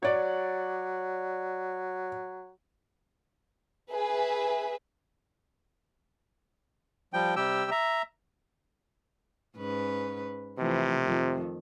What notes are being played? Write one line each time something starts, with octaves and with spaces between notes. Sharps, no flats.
F#3 C#5 D5
G#4 B4 E5
F3 G3 G5
C3 G3 G4 G5 E6
E5 A#5
G#2 C#4 B4
C3 E3 F3 A3
F2 D#3